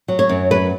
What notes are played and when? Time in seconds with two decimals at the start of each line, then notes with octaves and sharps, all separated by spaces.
0.08 F#3
0.19 C#5
0.29 F#2
0.51 F#3 B4